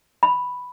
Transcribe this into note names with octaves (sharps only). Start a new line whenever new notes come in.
B5